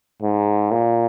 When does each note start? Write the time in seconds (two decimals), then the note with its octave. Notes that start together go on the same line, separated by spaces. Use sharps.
0.22 G#2
0.71 A#2